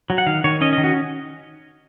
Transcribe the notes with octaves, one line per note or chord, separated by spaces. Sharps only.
F#3
F#5
D#3 F5
D#3 C#5
C#4 D#5
D#5
D#3
F#4